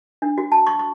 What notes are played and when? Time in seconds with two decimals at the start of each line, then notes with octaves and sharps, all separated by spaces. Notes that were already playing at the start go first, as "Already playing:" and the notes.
0.22 D4
0.38 F#4
0.52 A5
0.67 C#6
0.79 C#6